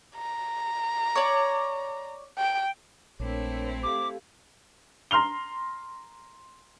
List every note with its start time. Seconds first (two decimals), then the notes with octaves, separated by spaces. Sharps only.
0.16 A#5
1.16 C#5 D5
2.38 G5
3.20 A#1 A3 C4 D4 E4 A#4 C#5
3.83 G4 A4 F5 D6
5.11 A#5 C6 F6 F7 G7